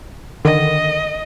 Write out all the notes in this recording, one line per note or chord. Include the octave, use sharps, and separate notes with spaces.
D3 D#3 D#5